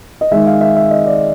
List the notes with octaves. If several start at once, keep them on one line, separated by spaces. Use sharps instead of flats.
D#5
D#3 G#3 E5
F5
E5
E5
D#5
D5